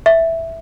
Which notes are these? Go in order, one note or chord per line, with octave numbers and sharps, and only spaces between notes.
E5